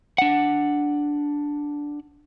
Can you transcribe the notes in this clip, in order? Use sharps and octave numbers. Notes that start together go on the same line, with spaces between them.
D4 F#5